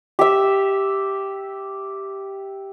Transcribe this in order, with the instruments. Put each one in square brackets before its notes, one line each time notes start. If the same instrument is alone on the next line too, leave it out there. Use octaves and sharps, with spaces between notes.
[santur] G4 E5